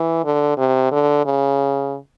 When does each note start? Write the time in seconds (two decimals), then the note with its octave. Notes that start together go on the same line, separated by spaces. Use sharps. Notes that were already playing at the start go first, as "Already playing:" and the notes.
Already playing: E3
0.24 D3
0.57 C3
0.91 D3
1.25 C#3